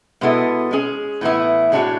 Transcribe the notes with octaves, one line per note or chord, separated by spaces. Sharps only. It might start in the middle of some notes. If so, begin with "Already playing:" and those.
B2 G#3 B3 E4 A4
G#3 C#4 G#4
A2 E3 B3 E4
A2 G#3 D4 F#4 C#5